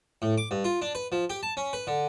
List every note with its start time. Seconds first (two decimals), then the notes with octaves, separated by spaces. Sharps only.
0.22 A2
0.38 D6
0.51 G2
0.64 F4
0.82 D4
0.95 B4
1.12 F3
1.30 G4
1.43 A5
1.57 C#4
1.73 B4
1.87 D3